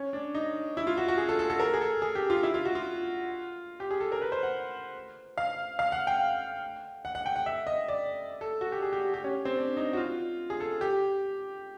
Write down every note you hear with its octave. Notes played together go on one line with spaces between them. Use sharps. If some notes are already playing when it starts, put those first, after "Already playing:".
Already playing: C#4
D4
D#4
E4
F4
F#4
F#4
G#4
A4
A4
A4
A#4
G#4
A4
G#4
G4
F4
E4
F4
F#4
F4
G4
G#4
A4
A#4
B4
C5
F#5
F5
F5
F#5
G5
F#5
F#5
G5
F#5
E5
D#5
D5
A4
F#4
G4
G#4
G4
G4
C#4
C4
D4
D#4
F#4
F4
G#4
A4
G4